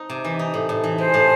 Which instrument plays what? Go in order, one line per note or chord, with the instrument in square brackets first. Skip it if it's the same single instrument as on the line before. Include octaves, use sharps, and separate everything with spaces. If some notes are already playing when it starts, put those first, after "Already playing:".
Already playing: [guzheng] C4 D#4
C3
E3
D#4
A2
A2
E3
[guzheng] G#3 [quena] C5
[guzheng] A2